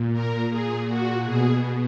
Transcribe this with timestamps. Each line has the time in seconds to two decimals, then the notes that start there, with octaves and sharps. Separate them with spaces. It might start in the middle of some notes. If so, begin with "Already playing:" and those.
Already playing: A#2
0.13 A#4
0.50 A#2 G#4
0.88 F#4
1.24 B2 G#4